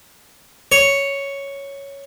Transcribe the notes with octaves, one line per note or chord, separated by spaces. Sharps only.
C#5